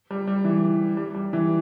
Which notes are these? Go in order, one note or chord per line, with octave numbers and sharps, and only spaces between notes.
G3
G3
E3
G3
G3
E3